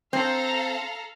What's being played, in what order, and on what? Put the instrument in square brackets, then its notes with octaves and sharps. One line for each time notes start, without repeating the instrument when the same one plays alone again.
[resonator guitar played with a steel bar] C4 [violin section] A4 F5 A#5